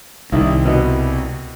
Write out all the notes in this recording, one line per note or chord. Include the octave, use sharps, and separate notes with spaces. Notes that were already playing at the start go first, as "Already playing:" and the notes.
C2 D#3 E4
B2